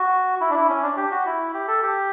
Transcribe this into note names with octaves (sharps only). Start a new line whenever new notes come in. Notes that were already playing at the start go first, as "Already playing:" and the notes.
Already playing: F#4
E4
D4
E4
C#4
D4
G4
F#4
E4
G4
A4
G4